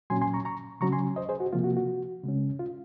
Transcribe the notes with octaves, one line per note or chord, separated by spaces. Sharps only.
A#2 F#3 C#4 G#5 C6
G#5 C6
A#5 C#6
A#5 C#6
C#3 F#3 C#4 A#5 C#6
G#5 C6
C5 D#5
G#4 C5
F#4
C3 F3 A#3 F4
F#4
F#4
C#3 G#3 C#4
F4